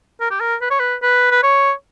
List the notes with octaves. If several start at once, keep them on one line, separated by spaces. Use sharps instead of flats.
A#4
G4
A#4
B4
C#5
B4
B4
B4
C#5